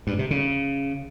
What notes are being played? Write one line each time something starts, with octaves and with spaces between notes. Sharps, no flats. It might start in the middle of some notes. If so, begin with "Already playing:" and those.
G2
C3
C#3